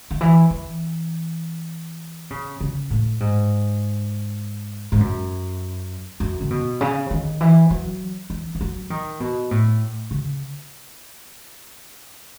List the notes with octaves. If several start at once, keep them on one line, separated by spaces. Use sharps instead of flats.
D#3
E3
E3
C#3
C#3
A2
G#2
G#2
F#2
F#2
C#3
B2
C#3
D#3
E3
F#3
E3
E3
F#3
D#3
B2
A2
C#3